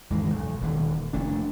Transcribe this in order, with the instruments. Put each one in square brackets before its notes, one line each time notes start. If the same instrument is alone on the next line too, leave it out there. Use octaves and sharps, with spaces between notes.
[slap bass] E2 G#2 D#3 G#3
B1
D#1 D#2 B2
F1 A3 D4